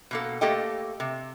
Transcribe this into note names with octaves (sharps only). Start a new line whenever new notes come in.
B2 A#3 A4
A3 A#3 G4 A4 D#5 G5
C3